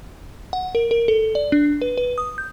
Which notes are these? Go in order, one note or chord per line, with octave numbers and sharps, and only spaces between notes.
F#5
A#4
A#4
A4
D5
D4
B4
B4
D#6
G6